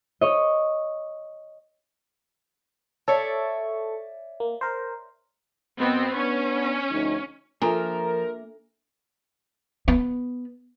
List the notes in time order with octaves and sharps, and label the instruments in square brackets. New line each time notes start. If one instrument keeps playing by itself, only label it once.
[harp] C#5 D#5
[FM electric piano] A4 C#6 [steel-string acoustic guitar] C#5 D5 E5
[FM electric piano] A#3
A#4 C5
[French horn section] F#2 D#5 [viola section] B3 C4
[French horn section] B3 D4 [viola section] C#4
[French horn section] D2 F3 D#4
[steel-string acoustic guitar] F3 [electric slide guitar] A#3 E5 [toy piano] D4 A4 A#5 [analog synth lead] A#4
[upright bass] B3